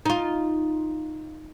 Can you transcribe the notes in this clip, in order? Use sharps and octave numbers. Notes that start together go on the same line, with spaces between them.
D#4 F4